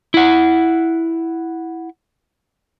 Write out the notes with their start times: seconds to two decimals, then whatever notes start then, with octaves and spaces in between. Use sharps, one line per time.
0.14 E4 F#5